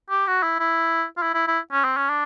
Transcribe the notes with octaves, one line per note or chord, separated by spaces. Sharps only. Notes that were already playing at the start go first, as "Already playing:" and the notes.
G4
F#4
E4
E4
F4
E4
E4
E4
C#4
C4
C#4
D4